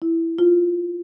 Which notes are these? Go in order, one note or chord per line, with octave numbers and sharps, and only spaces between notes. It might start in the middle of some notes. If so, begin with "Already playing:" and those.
E4
F4